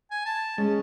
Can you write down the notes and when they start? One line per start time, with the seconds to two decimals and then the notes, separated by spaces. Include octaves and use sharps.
0.11 G#5
0.26 A5
0.58 G#3 C#4